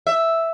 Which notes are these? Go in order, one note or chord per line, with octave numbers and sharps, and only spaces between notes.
E5